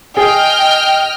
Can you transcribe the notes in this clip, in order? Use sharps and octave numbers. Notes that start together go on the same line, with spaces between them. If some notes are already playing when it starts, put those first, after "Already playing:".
G#4 D#5 G5 F6